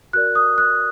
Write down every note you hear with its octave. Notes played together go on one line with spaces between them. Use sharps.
F#4 A#4 D5 F#6
D#6
F#6